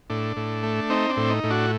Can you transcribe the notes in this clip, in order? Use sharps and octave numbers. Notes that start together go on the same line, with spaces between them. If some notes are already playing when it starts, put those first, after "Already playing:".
A2 D4
A2
A3
C4 D#4
D4
A2
D#4
A2
D4 F#4